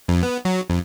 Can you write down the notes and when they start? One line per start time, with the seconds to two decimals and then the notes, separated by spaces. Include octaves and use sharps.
0.08 F2
0.23 B3
0.45 F#3
0.70 F2